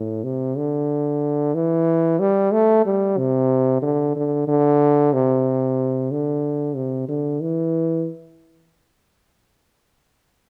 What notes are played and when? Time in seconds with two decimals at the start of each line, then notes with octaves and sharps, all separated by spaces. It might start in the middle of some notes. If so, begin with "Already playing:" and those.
Already playing: A2
0.24 C3
0.57 D3
1.55 E3
2.19 G3
2.52 A3
2.85 G3
3.18 C3
3.82 D3
4.16 D3
4.48 D3
5.13 C3
6.11 D3
6.76 C3
7.09 D3
7.41 E3